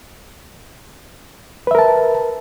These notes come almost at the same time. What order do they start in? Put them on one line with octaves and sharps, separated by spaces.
B4 E5 A#4 A5